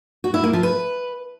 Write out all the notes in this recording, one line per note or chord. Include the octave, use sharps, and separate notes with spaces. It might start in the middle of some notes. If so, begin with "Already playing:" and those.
F#4
E4
A#3
F3
B4